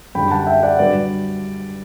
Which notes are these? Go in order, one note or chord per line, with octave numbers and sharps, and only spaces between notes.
F#2 D3 G3 G5 B5
F#5 A5
E5 G5
D5 F#5
G2 D3 F#3 B4 D5